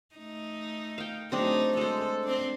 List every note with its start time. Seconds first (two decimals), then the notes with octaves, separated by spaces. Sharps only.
0.15 A3 D#4
0.98 F5 G5
1.32 F#3 A3 C4 D4 D#4 G#4
1.77 G#3 A4 C5
2.23 C4 D4